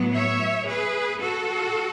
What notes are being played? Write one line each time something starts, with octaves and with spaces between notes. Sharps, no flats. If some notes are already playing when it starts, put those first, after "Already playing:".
Already playing: A2 F#3 B3
C#5 E5
G#4 B4
F#4 A4